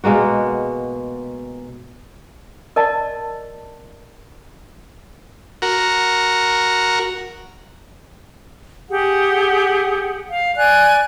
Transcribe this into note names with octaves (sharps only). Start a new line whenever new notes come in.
B2 G#3 A#3 F#4
A#4 D5 D#5 A5
F#4 A#4
G4 G#4 F#5
F5
D5 G#5 F#6